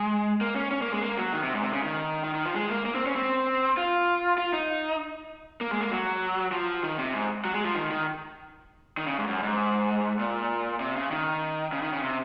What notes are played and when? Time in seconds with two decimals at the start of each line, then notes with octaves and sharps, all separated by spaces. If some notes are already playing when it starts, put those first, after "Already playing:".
Already playing: G#3
0.41 A#3
0.56 C#4
0.71 C#4
0.82 A#3
0.92 G#3
1.02 A#3
1.18 F#3
1.33 D#3
1.43 C3
1.53 G#2
1.63 C3
1.73 C#3
1.83 D#3
2.24 D#3
2.34 D#3
2.45 F3
2.55 G#3
2.69 A#3
2.85 A#3
2.95 C4
3.06 C#4
3.16 C4
3.77 F4
4.38 F4
4.53 D#4
5.61 A#3
5.71 G#3
5.81 A#3
5.91 F#3
6.52 F3
6.83 D#3
6.99 C3
7.14 G#2
7.45 F#3
7.54 G#3
7.65 F3
7.75 D#3
7.90 D#3
8.97 D#3
9.07 C#3
9.18 G#2
9.27 F#2
9.43 G#2
10.19 A#2
10.80 C3
10.96 C#3
11.11 D#3
11.72 C#3
11.82 D#3
11.93 C#3
12.03 C3